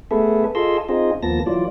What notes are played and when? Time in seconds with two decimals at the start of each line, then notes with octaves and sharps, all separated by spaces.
0.11 A3 B3 G#4 A4 B4 E5
0.55 F4 G#4 A4 D#5 C6 E6
0.89 C4 D#4 F4 G#4 D#5
1.22 D#2 F3 A#3 B3 A5 A#6
1.46 E3 F#3 F4 D5